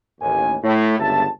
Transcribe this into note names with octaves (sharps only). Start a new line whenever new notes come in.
A1 D#2 G#5
A2
G1 C#2 E5 A5